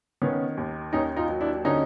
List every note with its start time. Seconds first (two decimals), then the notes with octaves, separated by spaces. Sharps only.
0.22 D#3 B3 C#4
0.57 D#2
0.93 D#2 C#4 D#4
1.16 D#4 F4
1.29 F#3
1.41 D4 E4
1.65 D3 C#4 D#4